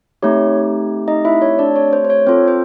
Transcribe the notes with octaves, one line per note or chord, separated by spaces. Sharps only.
A3 C4 D#4 G4 C#5
D#4 D#5
E4 E5
C#5
D4 D5
C#5
C5
C5
C#5
C4 F4 A4 C5
C5